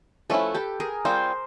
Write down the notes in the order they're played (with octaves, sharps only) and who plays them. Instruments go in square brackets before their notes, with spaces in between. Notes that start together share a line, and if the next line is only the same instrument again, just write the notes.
[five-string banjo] F3 A3 C#4 E4 [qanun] A4 B4
[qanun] G4 A4
G#4 A#4
[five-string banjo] G3 C4 F4 [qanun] A#4 C5